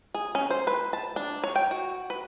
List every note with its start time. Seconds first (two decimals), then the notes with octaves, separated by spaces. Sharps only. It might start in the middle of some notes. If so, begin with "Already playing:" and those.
0.14 G#4
0.35 C#4
0.50 C5
0.67 B4
0.93 A5
1.16 D4
1.44 C#5
1.56 G5
1.71 F#4
2.10 B4